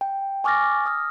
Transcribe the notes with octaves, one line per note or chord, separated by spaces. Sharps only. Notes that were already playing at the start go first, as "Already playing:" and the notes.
G5
G#5 C#6 D6 F6 A6 A#6
D#6 F6